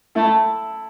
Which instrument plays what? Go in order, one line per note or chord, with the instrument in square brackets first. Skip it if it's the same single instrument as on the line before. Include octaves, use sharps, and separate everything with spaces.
[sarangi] A3 [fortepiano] E4 A4